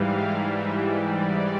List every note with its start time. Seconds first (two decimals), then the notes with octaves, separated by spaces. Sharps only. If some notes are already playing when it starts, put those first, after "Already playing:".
Already playing: G#2 E3 G3 F5
0.48 E5
0.78 D5
1.10 D5